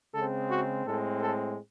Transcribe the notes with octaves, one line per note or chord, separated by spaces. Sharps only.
C#3 G#3 C4 A4
F#4
A2 G#3 C4 A4
A4